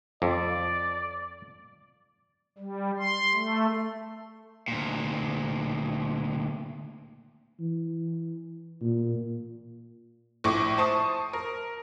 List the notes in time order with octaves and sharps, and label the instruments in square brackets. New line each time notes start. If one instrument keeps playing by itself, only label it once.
[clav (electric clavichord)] F2 [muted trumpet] D5
[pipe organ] G3
C6
A3
[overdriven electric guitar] D2 A#2
[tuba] E3
A#2
[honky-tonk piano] A#1 A2 C#6 D6
C5 A5 C#6 D#6
A#4